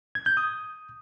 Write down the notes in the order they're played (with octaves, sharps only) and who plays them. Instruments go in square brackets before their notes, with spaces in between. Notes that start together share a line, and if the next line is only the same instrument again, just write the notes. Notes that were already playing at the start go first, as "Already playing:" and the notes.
[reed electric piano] G#6
G6
D#6